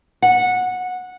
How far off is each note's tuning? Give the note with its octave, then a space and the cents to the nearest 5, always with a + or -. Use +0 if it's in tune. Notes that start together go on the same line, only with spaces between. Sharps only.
F#5 -15